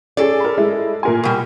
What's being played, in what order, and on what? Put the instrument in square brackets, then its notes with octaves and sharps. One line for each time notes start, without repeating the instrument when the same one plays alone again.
[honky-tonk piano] C#4 G#4 [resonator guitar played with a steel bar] A4 D5
[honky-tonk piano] A#4 B5
G#3 E4
A#2 A#4 G#5
[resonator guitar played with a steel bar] B2 G3